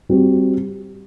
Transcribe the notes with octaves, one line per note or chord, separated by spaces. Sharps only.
G3 C4 F#4